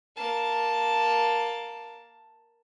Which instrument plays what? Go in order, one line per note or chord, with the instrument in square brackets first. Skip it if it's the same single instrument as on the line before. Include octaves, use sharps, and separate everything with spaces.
[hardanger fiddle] A#3 A5